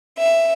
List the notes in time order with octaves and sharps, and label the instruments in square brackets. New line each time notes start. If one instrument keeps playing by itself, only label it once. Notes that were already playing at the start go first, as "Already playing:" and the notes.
[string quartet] E5